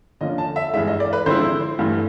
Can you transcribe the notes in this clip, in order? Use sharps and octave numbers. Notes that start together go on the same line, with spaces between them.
D3 F3 A#3 C#4 D#5
A5
E5
G2 E3 G#3 E5
D#5
D5
B4
D3 F3 G#3 C4 E4 C5
G2 E3 A3